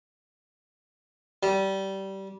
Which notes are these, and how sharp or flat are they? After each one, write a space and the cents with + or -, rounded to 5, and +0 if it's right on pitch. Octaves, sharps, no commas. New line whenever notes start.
G3 -20